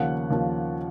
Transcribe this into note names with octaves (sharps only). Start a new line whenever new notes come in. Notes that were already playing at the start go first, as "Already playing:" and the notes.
Already playing: D#2 C#3 F3 A#3 F#5 F#6
D#2 C#3 F3 A#3